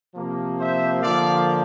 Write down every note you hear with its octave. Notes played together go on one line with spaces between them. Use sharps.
C3 F3 A#3
C5 E5
D3 F3 A#3 D5 F5